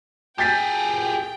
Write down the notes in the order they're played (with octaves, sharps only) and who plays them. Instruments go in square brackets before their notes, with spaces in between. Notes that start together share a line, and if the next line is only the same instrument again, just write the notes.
[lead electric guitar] G4 G#4 [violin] G5 [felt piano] G6 A6 B6